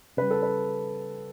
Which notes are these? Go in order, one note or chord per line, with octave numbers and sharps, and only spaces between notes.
C#3 G3 B4
A4
B4